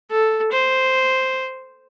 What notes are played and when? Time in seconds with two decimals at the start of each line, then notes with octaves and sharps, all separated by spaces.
0.10 A4
0.52 C5